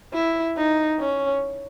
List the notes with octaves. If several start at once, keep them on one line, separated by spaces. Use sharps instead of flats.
E4
D#4
C#4